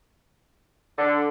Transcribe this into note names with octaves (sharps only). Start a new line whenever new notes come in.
D3